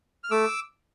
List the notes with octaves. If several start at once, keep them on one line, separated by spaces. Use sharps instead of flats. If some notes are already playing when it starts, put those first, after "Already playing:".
F6
A3 D6 E6